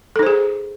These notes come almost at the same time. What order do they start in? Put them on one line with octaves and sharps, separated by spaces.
A4 D#4 C5 G#4